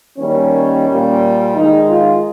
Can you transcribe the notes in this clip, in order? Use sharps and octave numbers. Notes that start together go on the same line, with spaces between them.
D#3 G3 A#3 C#4
A#2 G3 A#3
D#3 G#3 D#4
F4